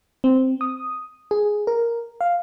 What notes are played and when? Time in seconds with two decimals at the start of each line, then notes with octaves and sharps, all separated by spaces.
0.24 C4
0.61 D#6
1.31 G#4
1.67 A#4
2.21 F5